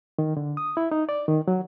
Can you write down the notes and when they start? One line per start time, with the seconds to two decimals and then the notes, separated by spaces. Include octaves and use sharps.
0.18 D#3
0.37 D3
0.57 D#6
0.77 E4
0.91 D#4
1.09 D5
1.28 D#3
1.48 F#3